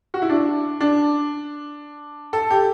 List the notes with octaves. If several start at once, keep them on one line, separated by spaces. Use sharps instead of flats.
F#4
E4
D4
D4
A4
G4